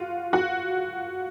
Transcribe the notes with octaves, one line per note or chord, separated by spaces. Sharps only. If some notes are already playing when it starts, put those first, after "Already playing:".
Already playing: F4 F#4
F#4